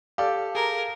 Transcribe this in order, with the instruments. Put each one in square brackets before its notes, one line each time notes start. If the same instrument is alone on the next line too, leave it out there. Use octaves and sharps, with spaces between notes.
[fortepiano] G4 A4 D5 [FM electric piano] F5
[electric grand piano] G#4 A#5 [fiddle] A#4